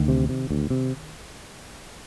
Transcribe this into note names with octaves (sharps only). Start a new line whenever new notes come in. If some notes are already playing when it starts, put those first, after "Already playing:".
Already playing: D2 D#3
C3
C3
D2
C3